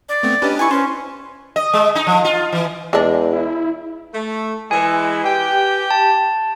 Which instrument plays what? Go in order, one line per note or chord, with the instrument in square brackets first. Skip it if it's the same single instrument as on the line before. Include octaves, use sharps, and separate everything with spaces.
[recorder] D5
[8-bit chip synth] A3 B3 C4
[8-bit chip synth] C#4 D4 G4 [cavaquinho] B4 D#5
[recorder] E4 [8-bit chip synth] B4 [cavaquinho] G#5 C#6
[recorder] C#4 [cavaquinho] C5
[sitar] D#5
G#3
D#4
F3
F4
E3
[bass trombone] E2 [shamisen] G#3 D4
[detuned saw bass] E4
[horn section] A3
[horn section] E3 G#3 E4 [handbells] B4 G#5
[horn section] G4 G5
[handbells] A5